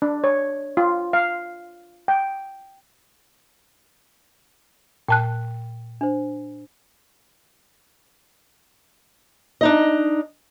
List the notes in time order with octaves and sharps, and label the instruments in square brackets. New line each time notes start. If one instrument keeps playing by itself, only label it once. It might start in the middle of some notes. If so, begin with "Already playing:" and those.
[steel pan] D4
C#5
F4
F5
G5
[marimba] A#2 A5 F#6 [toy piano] G5
[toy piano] D4 C5
[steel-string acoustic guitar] D4 D#4 D#5